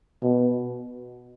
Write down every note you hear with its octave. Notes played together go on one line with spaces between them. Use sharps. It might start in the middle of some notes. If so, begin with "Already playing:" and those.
B2